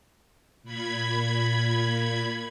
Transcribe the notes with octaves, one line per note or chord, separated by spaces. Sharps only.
A#2 B5 G#6